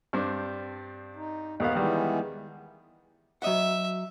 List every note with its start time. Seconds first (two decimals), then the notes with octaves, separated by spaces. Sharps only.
0.13 G2 C4 D4
1.16 D#4
1.60 D#2 B3 F5
1.75 D#3 E3 G3 G#3 B3
3.42 F#3 D#5 E5 F#5